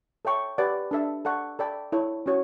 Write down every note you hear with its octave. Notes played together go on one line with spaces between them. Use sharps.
A4 C#5 E5 G5 C#6
G4 B4 D5 F#5
D4 A4 E5 A5
A4 D5 F#5 C#6
A4 D5 G5 B5
E4 A4 C#5
C#4 F#4 C#5